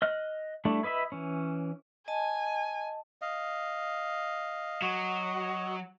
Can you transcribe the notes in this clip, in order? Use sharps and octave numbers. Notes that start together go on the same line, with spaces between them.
D#5 F6 F#6
G3 A3 D4 E4
E4 B4 D#5 E5 B5
E3 C#4
D#5 G#5 A5
D#5 F5
F#3 F#4 D#5